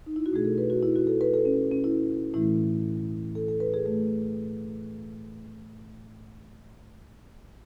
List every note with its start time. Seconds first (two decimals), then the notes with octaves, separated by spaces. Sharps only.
0.06 D#4
0.16 E4
0.26 F#4
0.33 B2 A3 G#4
0.45 A4
0.58 B4
0.70 F#4
0.83 E4
0.96 F#4
1.07 A4
1.21 B4
1.34 A4
1.45 C#4
1.71 C#4
1.84 E4
2.34 A2 E3 A3 E4
3.35 A4
3.48 A4
3.60 B4
3.74 G#4
3.86 A3